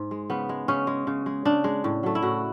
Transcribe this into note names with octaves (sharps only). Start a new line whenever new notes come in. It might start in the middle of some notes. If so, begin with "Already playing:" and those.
Already playing: G#2
G#3
C#3 B3
G#3
C#3 C#4
G#3
C#3
G#3
C#3 D4
G#3
A2
F#3 A3
E4
A2 F#4